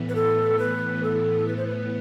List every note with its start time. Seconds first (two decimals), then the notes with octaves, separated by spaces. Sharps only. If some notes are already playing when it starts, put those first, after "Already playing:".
Already playing: A2 E3 B3
0.09 B4
0.15 A4
0.59 B4
1.03 A4
1.48 B4
1.57 C5
1.67 B4